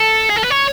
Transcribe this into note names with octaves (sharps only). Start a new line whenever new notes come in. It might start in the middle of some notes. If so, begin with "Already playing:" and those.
Already playing: A4
G#4
A4
B4
C#5